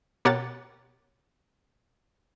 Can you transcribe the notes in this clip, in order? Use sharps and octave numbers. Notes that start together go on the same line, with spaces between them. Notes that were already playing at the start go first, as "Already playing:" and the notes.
B2 G4 A#4 C#5 F#5 A6